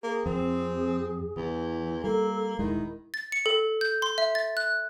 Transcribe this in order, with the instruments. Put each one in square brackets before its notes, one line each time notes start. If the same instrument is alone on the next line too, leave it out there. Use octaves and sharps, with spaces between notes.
[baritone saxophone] A#3 [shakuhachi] G#4
[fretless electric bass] F2 [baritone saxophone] C4
[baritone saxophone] E2 [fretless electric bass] E3
[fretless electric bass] G3 [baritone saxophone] A#3 [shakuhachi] A4
[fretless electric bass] D#1 G#3 [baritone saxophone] D#3 [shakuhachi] E4
[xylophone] A6
C#7
A4
G6
C6
E5
A6
F#6